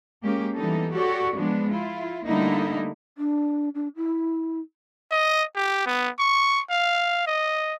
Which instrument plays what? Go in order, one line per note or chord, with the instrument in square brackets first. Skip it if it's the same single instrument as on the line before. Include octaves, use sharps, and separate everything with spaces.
[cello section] G#3 A#3 C#4 G4
E3 G3 B3 D#4 A4
F#4 G4 A4 C#5 D5
F3 G#3 B3 D4
E4 F4
D3 G3 A3 A#3 D#4 E4
[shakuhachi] D4
D4
E4
[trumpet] D#5
G4
B3
C#6
F5
D#5